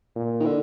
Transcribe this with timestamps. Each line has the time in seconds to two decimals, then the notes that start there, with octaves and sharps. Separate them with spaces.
0.16 A#2
0.40 D#3
0.45 D3